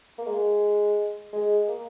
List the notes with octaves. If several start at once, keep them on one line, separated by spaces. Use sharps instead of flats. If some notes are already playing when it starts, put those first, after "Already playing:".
A#3
G#3
G#3
A#3